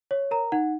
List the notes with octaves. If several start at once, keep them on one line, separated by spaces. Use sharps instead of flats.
C#5
A#4 A#5
D#4 F#5